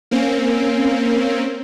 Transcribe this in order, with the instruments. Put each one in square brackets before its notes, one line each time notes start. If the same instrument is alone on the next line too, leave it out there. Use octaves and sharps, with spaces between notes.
[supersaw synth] A#3 C4 C#4